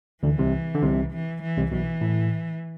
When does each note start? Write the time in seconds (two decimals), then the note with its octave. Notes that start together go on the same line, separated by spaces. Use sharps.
0.23 D2 D3 E3
0.38 C2 C3
0.75 D3
0.82 C2 C3
1.13 E3
1.42 E3
1.58 C2 C3
1.71 B1 B2 E3
2.01 A2